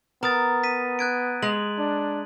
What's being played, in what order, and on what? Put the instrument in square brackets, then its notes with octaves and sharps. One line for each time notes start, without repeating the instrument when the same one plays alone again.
[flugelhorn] B3 [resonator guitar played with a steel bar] A#4 [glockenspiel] A#5 D#6 A6
[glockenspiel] B6 D#7
F#6 G#6 D7
[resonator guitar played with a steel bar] G#3 [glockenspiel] F#7
[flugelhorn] D4